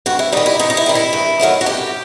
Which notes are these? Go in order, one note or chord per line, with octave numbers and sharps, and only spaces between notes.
G2 F#4
E4
D#3 G3 D#4
E4
G2 D#4
D#4
E4
D#3 G3
E4
G2
D#3 F#3 A3 D#4
F#4
G2 G4